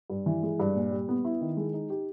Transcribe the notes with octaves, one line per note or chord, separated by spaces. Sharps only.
G2
E3
G#3
G2
A#2
G3
B3
E4
D#3
G#3
D#4
G4